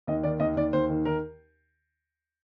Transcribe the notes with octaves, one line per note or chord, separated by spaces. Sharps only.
D#2 D#5
D#3 D5
D#2 D#5
D#2 D5
D#2 C5
D#3
D#3 A#4